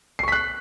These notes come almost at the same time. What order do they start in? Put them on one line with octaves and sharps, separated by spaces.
C7 C#6 B6 F#6